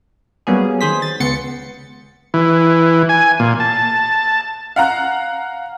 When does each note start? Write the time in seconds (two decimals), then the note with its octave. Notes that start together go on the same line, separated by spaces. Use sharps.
0.47 F#3 G3 A#3 B3 C#4 G#4
0.81 D#3 G#4 C5 B6
1.02 A6
1.20 C#2 B3 C6 A6 C#7
2.34 E3
3.09 G#5
3.39 A#2
3.60 A5
4.76 F5 F#5 A#5 F#6